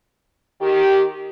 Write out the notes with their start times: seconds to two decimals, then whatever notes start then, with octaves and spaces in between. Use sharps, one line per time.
0.62 D#3 G4